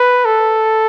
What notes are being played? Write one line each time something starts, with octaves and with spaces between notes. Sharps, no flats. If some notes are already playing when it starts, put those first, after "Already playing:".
Already playing: B4
A4